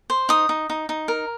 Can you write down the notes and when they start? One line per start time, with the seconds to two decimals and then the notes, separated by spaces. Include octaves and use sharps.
0.10 C5
0.29 D#4 D#6
0.49 D#4
0.70 D#4
0.89 D#4
1.08 A#4